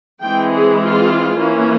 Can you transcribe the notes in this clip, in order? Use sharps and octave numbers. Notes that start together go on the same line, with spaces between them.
E3 G#3 C4 G5
G#4
F4
E3 A#3 C#4